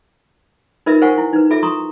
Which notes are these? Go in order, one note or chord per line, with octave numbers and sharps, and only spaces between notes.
D#4 F4 A#4 B4 D#5 E5
A#4 C5 F5 F#5 G#5 C#6
E4
D#4 B4
F4 A4 E5 D6
A#5 C6 C#6 D#6